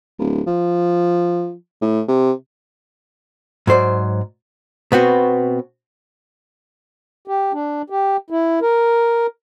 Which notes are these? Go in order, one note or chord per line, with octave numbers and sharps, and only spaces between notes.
D1
F3
A2
C3
G#2 F#3 C5 D5
B2 B3 C4 F#4
G4
D4
G4
E4
A#4